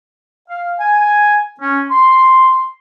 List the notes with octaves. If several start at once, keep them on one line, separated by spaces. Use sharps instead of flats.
F5
G#5
C#4
C6